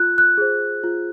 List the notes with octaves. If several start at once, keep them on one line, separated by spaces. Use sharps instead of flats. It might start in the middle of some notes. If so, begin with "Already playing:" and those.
Already playing: F4 F#6
F#6
G#4 C5
F4